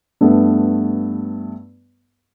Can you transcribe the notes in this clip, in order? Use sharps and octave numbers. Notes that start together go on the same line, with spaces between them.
G2 A3 B3